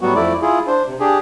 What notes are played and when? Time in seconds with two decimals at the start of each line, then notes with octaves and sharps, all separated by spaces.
0.01 A2 F#3 G3 B3 F#4
0.15 F2 A3 E4 D5
0.42 E4 F4 G#4
0.67 D4 C5
0.87 C3
1.00 D4 G4 G#4